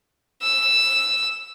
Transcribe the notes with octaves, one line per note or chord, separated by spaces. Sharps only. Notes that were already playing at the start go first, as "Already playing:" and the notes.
E6